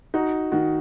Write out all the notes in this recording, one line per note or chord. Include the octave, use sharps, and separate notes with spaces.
D#4 F#4
D#3 F#4